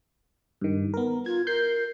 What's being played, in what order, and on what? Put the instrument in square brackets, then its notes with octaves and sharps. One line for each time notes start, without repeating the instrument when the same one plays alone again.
[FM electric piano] G2 D#3
B3 A#4
[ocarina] F4 [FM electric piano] G#6
[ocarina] A#4 [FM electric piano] G6 C7